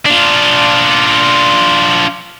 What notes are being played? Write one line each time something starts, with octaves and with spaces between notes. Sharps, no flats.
D4 F4